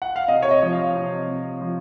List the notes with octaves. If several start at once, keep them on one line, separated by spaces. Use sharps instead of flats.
F#5
F5
C3 D#5
C#5
D#5
F3
F5
C3
C3
F3